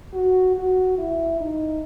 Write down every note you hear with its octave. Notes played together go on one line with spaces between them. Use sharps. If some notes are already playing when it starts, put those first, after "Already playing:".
F#4
F#4
E4
D#4